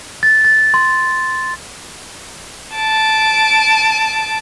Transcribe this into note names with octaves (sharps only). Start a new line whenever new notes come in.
A6
A6
C6
A5 D7